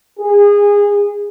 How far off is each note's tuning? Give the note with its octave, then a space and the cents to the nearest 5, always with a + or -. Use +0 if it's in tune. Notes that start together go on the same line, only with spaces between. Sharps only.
G#4 -25